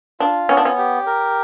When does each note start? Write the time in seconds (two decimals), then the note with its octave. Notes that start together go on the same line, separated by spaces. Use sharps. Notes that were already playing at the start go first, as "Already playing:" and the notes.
0.20 D4 F4
0.49 B3 C#4
0.57 D4
0.65 C#4
0.78 G4
1.06 A#4